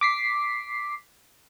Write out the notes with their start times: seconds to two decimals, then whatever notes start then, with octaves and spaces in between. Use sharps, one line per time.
0.01 D6 B6 C7